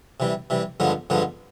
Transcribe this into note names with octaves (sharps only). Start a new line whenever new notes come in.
C3 E3 G3
C3 E3 G3
G2 D3 F3 G#3 B3
G2 D3 F3 G#3 B3